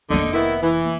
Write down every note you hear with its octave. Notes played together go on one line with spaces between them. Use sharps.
F1 D3 A#3 D#4
D#3 B3 E4
E3